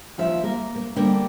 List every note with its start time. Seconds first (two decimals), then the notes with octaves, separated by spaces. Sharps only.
0.18 D#2 F3 E5
0.44 A#3 A#4
0.76 A#3
0.96 D3 G3 A#3 D4